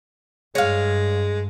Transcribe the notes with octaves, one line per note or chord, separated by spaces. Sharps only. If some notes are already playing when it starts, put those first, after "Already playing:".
G2 G#3 C#5 F5